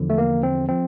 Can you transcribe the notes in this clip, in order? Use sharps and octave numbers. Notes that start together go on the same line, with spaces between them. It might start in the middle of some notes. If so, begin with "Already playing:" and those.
Already playing: E2 D3 F3
A3
A#3
C4
F3 C4